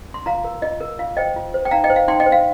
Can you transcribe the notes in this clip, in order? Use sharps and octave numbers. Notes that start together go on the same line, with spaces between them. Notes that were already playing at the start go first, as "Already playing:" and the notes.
C6
F4 F5 A#5
A#4
F4 D#5
A#4
F4 F5
C5 D#5 G5
F4
C5
G5
D#4 F5 A#5
D#5 G5
C5
F5
D#4 G5 C6
D#5 G5
C5
F5